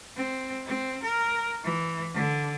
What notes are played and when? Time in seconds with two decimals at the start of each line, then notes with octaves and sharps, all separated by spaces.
0.16 C4
0.66 C4
1.03 A#4
1.64 E3
2.14 D3